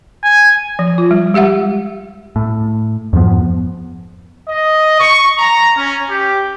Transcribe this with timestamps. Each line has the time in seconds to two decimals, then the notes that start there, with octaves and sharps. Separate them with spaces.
0.24 G#5
0.79 F3
0.98 F4
1.11 G3
1.34 G#3 G4 E5 F#5
2.36 A2
3.13 F2 G#2 F3 B3
4.49 D#5
5.00 C#6
5.38 A#5
5.76 C#4
6.09 G4